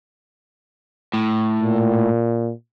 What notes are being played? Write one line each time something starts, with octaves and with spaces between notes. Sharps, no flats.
A2
A#2